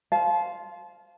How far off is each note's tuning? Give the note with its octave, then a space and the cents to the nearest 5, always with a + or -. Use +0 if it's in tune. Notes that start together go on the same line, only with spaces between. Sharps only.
C5 +0 F5 +0 A5 -35